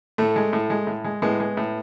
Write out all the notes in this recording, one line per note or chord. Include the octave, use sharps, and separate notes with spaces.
A2 A3
G#3
A2
G#3
A2
G#3
A2 G#3 B3
G#3
A2